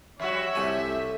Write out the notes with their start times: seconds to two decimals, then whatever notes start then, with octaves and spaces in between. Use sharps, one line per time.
0.20 F2 G3 F#4 C#5 E5
0.55 C2 A3 G#5